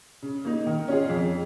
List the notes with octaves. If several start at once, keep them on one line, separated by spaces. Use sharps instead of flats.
C#3
A#3 D#4
D#3
C#4 F4 G#4
F2